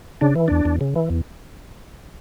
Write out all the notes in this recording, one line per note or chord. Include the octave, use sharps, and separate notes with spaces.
C#3 D4
E3
E2 D4
E2
C#3
E3
E2